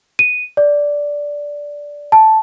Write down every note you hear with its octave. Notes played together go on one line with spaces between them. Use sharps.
D#7
D5
A5